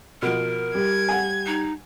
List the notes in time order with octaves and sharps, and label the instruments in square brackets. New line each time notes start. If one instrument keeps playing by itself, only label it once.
[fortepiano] B2 F3 [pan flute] A#4
[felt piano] G3 [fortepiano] G4 [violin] G#6
[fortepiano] F#5 G#5
[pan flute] D#4